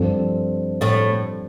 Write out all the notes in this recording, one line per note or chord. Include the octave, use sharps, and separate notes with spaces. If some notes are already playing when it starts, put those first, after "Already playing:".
Already playing: G2 F3 C4 F4 A4
A2 A3